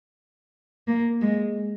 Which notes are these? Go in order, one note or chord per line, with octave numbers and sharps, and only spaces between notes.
A#3
G#3